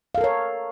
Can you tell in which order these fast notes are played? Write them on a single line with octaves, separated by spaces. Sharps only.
F5 A4 A#4 C#5